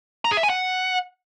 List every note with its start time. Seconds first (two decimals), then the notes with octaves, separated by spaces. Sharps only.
0.25 A#5
0.31 G#4
0.37 E5
0.43 G#5
0.49 F#5